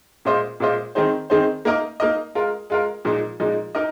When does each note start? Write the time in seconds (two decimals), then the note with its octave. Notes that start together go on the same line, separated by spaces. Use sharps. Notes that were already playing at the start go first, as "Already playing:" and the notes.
0.25 A#2 G#3 F4 C5 D#5
0.60 A#2 G#3 F4 C5 D#5
0.95 D#3 C4 D#4 G#4 C5
1.30 D#3 C4 D#4 G#4 C5
1.65 A#3 D#4 A#4 D#5
2.00 A#3 D#4 A#4 D#5
2.35 G#3 F4 A#4
2.70 G#3 F4 A#4
3.05 A#2 F3 G#3 D#4
3.40 A#2 F3 G#3 D#4
3.75 D#4 A#4 D#5